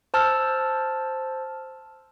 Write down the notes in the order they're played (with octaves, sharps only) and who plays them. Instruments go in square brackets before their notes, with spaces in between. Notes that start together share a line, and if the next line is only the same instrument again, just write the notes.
[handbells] C5 A5 E6 F6